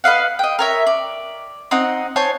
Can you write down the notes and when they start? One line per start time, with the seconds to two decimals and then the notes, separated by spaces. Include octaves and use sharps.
0.04 B4 D#5 F5 F#5
0.39 D#5 G5
0.59 A#4 C#5 E5
0.86 D5
1.71 C4 D#4 D#5 F#5
2.16 C5 C#5 G#5 A5